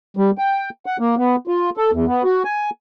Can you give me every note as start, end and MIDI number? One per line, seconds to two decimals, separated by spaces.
0.17 0.31 55
0.38 0.69 79
0.86 0.97 78
0.99 1.15 58
1.17 1.36 59
1.47 1.70 65
1.77 1.91 69
1.92 2.05 40
2.08 2.22 59
2.24 2.43 66
2.45 2.70 80